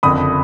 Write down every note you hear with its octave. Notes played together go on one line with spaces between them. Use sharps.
F#1 F2 D3 B5 D#6